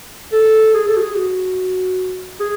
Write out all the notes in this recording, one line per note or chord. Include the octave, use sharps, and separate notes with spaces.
A4
G#4
A4
F#4
G#4
F#4
G#4